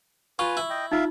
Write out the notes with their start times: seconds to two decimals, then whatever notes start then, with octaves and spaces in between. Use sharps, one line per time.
0.39 F4 B4 G#5 C#6
0.57 E4
0.70 D#5 G5
0.92 D#4 F4 E5 F5